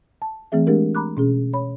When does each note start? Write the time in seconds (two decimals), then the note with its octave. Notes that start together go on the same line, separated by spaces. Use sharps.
0.22 A5
0.52 E3 A3 C4 G#4 E5
0.67 G#3 A3 D4 G4 A#4
0.95 A#5 B5 D6 F#6
1.17 B2 C#4 G#4
1.53 C#5 B5